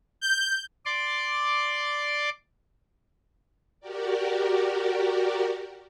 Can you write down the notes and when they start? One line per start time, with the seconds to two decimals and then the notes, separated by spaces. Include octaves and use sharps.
0.21 G6
0.85 D5 C6 D6
3.80 F#4 G4 A#4 D5